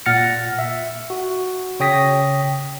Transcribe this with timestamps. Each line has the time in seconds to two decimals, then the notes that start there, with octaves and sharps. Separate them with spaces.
0.06 A#2 F#5 F6 A6 A#6 C#7
0.59 E5
1.10 F#4
1.80 C#3 C#5 G5 D#6 A#6 B6